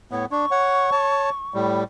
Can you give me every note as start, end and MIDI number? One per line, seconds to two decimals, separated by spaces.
0.11 0.26 45
0.11 0.26 59
0.11 0.25 73
0.31 0.46 62
0.31 1.66 85
0.51 0.90 73
0.51 0.90 78
0.92 1.30 73
0.92 1.30 81
1.54 1.84 45
1.54 1.84 55